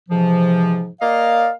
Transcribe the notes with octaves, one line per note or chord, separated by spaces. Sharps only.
G#2 C3 E3 F3
A#3 D5 D#5 F5